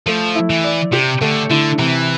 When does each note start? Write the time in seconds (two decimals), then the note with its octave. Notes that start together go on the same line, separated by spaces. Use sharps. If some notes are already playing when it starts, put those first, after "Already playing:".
0.06 F3 A3
0.35 E4
0.50 E3
0.64 D5
0.93 C3 G4
1.21 D3 A3
1.50 D3 E4
1.78 C3 E3